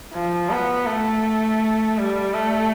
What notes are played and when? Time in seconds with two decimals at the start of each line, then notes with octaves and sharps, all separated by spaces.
0.13 F3
0.50 B3
0.86 A3
1.98 G3
2.34 A3